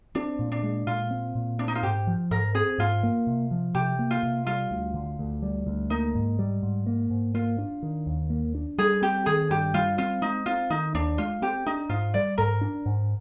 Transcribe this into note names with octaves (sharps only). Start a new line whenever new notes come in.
C4 D4
A#2
D4
G#3
A#2 F4
C4
A#2
C4 D4
D#4
F4
G#2 G4
F3
G#2 A#4
C4 G#4
G#2 F4
A#3
C3
F3
C3 G4
A#3
F4
C3
G3 F4
D2
D3
D2
G3
D2
A#3 D#4
G#2
G3
G#2
A#3
G#2
A#3 F4
D4
D#3
D#2
A#3
D4
G3 G#4
C4 G4
D#3 G#4
G2 G4
G3 F4
C4 F4
G#3 D#4
C4 F4
D#3 D#4
D#2 D4
G#3 F4
C4 G4
D4 D#4
G#2 F4
G3 D5
G#2 A#4
D4
G#2